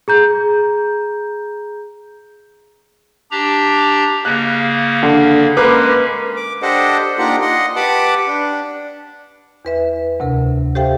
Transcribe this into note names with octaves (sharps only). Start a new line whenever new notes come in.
G#4 A#5 G6
D4 G4 A#5
C#3 A#3 F#6
D3
G#3 A#3 C#4 B4 D6
D6
D4 G4 A4 C5 D#5 F#5
A#3 D4 D#4 F4 G4 F#5
D#5 F#5 C6
G4 B4 F#5 A5 B5 D6
D4
E2 B4 E5
D2 C3 A#4
G4 A4 C5 E5 F5 G5